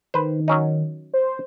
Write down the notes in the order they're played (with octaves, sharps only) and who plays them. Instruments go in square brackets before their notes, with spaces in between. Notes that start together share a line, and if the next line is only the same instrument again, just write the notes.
[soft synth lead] D#3 [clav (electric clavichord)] B4 C5
[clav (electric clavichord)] F#3 C#4 D#4
[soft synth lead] C5